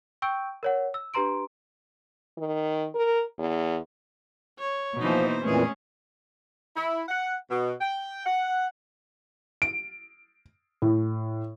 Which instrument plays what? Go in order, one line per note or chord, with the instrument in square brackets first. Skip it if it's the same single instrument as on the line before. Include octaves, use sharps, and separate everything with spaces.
[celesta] G5 C#6 E6 G6 D7
A#4 C#5 F#5
E6
D4 G4 B4 A#5 C6 D7
[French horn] D#3
A#4
E2
[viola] C#5
[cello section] B2 E3 A#3 [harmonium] F3 [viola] D#4 C5
[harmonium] F2 A#2 E3 [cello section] G#3 A3 G#4 [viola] C#4
[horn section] E4
F#5
B2
G5
F#5
[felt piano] D7
A2